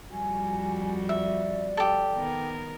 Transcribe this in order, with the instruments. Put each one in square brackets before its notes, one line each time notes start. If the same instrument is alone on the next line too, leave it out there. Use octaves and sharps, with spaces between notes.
[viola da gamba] F2 G3 F#4 [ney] G#5
[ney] D5 [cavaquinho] E5
[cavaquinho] G4 A4
[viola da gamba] D#3 B3 A#4